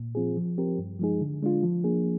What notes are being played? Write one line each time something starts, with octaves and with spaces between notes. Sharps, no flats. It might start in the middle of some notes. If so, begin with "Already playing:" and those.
Already playing: A#2
F3 C4 F4 G#4
F3
C4 G4 A#4
G2
F3 G#3 D#4 G#4
D3
G#3 D4 F4
F3
A#3 D4 G#4